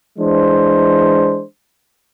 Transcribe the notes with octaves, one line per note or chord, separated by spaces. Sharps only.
E3 G#3 D4 C5